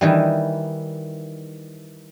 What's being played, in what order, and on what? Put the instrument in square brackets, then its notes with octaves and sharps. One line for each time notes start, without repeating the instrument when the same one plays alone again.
[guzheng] D#3 E3 G3